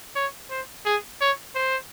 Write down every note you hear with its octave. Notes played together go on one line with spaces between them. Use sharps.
C#5
C5
G#4
C#5
C5